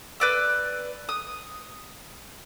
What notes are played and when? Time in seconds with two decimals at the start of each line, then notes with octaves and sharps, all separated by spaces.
0.20 B4 D5 E6
1.09 D#6